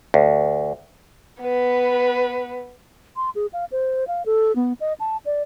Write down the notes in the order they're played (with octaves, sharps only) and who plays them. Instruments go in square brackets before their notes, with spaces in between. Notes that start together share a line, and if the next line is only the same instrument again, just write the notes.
[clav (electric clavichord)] D2
[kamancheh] B3 B4
[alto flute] C6
G#4
F5
C5
F5
A4
B3
D#5
A5
D5